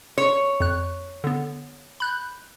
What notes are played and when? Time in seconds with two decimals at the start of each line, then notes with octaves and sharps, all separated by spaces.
0.18 C#5
0.60 F2 F#6
1.24 D3 B3
2.00 B5 F#6 G6